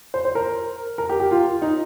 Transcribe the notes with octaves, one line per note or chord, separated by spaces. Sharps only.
C5
C5
A#4
A#4
G4
G4
F4
D#4